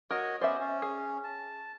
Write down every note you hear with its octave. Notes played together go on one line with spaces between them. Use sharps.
F#4 A#4 C#5 D#5
B3 C#4 C5 D5 E5
C#4
G#4
A5